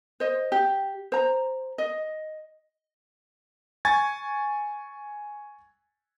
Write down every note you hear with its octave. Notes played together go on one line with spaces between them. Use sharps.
C5 D#5
G4
C5 A#5
D#5
G#5 C#6 G#6 A6